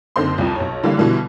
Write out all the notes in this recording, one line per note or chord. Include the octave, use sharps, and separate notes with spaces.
F#1 D3 C4 D#4 C6
C2 F2
B1 C#5
D3 E3 G3 A#3
B2 D3 E3 F3 G3